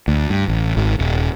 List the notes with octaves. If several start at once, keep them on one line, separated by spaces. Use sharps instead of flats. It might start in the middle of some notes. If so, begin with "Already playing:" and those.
D2
G2
A1
G#1
D#1